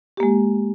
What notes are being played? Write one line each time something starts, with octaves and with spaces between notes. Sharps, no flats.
G#3 A#3 G4